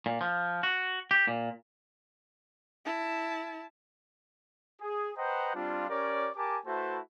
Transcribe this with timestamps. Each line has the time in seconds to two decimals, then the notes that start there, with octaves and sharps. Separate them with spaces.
0.06 A#2
0.21 F3
0.63 F#4
1.11 G4
1.28 A#2
2.85 E4 A5
4.80 G#4
5.16 B4 C5 D#5 F#5 G5 A#5
5.54 G3 C4 D4 F4
5.88 C#4 G4 A#4 C#5 D5
6.35 G4 A#4 G#5 A5 D6
6.65 A3 E4 F#4 B4 C5 A5